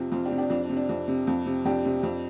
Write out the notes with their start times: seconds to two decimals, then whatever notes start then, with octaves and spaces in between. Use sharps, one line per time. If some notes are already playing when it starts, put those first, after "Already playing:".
Already playing: F2 C3 F4
0.12 F2 F4
0.25 D4 G4
0.31 C3
0.38 D4 G4
0.50 F2 D4
0.63 D4
0.70 C3
0.76 D4
0.89 F2
1.08 C3
1.27 F2
1.46 C3
1.65 F2 D4 G4
1.85 C3
2.03 F2